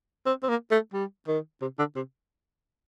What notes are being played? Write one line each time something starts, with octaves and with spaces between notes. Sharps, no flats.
C4
C4
A#3
A3
G3
D#3
C3
D3
C3